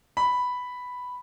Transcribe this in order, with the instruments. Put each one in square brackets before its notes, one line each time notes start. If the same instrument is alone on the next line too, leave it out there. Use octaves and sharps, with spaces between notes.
[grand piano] B5